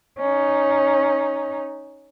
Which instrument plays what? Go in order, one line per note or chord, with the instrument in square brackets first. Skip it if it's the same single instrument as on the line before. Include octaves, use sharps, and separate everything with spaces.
[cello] C#4 D#4